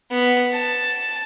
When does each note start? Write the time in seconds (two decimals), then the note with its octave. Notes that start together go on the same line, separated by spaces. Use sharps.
0.11 B3
0.52 A5